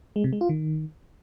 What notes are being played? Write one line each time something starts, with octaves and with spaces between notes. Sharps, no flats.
G#3
C3
G#3
F4
D#3